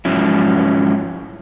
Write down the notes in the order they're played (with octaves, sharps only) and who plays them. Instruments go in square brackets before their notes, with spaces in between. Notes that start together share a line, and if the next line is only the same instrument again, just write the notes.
[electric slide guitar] G#2 F3 F#3 C#4 E4